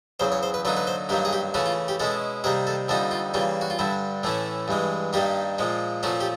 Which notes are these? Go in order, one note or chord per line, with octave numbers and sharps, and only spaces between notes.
E2 C#3 F#3 C5
C#5
C5
B4
D3 F#3 A#3 D#4 B4
B4
C5
G2 D#3 F#3 A#3 G4
G#4
G4
C#3 E3 A3 C#4 F#4
F4
G4
B2 G#3 C#4 E4 A4
C3 D#3 G3 A#3 G#4
A4
F2 D3 G3 A#3 D#4 A4
F4
C#3 E3 G3 A#3 F4
F#4
F4
G2 D3 G3 E4
A2 E3 A3 C#4 E4
G2 E3 G#3
G2 D#3 G3 A#3 G4
A#2 F3 G#3
A#2 F3 A3 C#4 F#4
G4